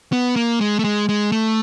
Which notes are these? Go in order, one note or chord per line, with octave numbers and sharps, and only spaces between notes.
B3
A#3
G#3
A3
G#3
G#3
A3